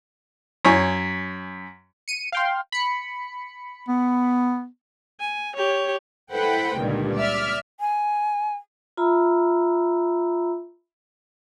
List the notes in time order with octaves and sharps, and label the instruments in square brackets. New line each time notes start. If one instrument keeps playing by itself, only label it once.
[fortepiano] F#2 C#5 G#5
[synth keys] C#7 D#7
F5 G5 C6
B5 C#7
[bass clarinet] B3
[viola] G#5
G4 C#5
[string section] E4 A4 B4 C5 F#5 G5
C#2 G2 A#2 D3 D#3
D5 E5 F6
[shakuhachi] G#5
[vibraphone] F4 E5 A#5 B5 E6